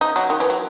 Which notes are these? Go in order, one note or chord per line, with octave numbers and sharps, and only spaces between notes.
D#4
F#3
D#3
E3
F#3